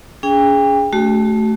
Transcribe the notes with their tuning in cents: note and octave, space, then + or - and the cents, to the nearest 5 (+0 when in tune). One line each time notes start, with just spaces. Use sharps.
C#4 +40 G#4 +0 G5 +35
A3 -10 F#4 +35